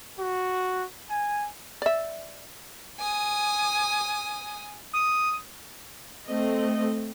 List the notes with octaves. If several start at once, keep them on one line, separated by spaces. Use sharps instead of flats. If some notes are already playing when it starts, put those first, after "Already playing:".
F#4
G#5
D5 E5
G#5 D#6
D#6
A3 C4 D#5